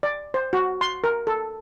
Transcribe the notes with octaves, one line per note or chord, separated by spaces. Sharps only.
D5
C5
F#4
C6
A#4
A4